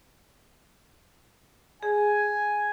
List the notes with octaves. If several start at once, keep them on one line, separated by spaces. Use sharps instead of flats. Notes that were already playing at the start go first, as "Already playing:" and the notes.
G#4 G#5